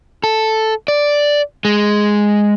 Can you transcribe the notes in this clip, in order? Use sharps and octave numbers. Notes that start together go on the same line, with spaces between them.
A4
D5
G#3